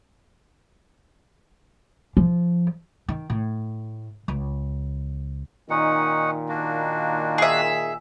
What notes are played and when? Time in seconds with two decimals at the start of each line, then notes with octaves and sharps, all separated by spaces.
2.17 F3
3.08 D#3
3.30 A2
4.28 C#2
5.70 A#2 D#3 C#4 D#4 F#5
6.49 A#3 D4 F#4
7.38 G#4 E5